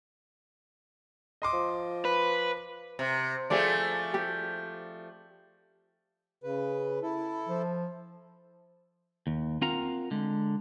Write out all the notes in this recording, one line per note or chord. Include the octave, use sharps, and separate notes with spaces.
D#5 C6 D6
F3
B4
C3
F3 A3 G4 G#4 D5
G4
C#3 B4
E4 A4
F3
D#2
C4 F4 A#4 F5 F#5 A#5
D3 G#3